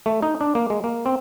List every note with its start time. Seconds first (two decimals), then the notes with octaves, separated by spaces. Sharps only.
0.06 A3
0.22 D#4
0.41 D4
0.55 A#3
0.70 G#3
0.84 A#3
1.06 C4